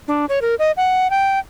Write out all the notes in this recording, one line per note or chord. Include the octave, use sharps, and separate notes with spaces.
D4
C#5
A#4
D#5
F#5
G5